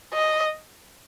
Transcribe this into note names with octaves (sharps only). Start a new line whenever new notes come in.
D#5